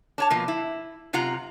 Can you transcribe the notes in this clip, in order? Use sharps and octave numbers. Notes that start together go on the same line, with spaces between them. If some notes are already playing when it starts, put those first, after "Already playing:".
D4 C#5 A5
B2 F3 A#3
E4
F#2 C3 F4 F#5 A#5